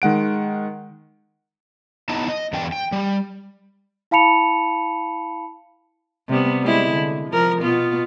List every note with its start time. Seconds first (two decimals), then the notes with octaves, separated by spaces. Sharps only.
0.02 D#3 G#3 F#5 D7
2.09 B3 D#4 E4 D#5 A5
2.29 D#5
2.53 E2 D4 G5
2.72 G5
2.92 G3
4.11 E4 F5 A5 B5 C#7 F7
6.29 C3 G3 B3
6.63 G3 G#3 E4
6.92 D3
7.29 F3 A#4
7.61 B2 B3 F4